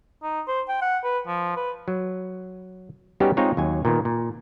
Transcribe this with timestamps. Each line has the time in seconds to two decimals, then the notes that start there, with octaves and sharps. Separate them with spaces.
0.23 D#4
0.48 C5
0.69 G5
0.82 F#5
1.04 B4
1.27 F3
1.56 B4
1.88 F#3
3.20 G3 B3 C#4 D#4 F#4 G4
3.37 G#3 C4 D#4 F4 C#5
3.57 D#2 F#3 G#5
3.85 A#2 D#3 B3
4.05 A#2